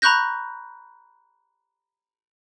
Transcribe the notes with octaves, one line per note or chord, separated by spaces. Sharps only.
A#5 B5 C#6 F#6 G6 A#6